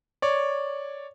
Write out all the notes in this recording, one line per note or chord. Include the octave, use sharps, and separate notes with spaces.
C#5 D5